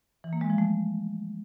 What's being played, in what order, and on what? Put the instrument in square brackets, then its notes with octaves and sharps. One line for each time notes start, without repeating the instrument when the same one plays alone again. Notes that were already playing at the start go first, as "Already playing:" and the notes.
[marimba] E3
A#3
G#3
F3
A3